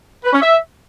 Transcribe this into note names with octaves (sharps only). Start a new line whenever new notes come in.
B4
C#4
E5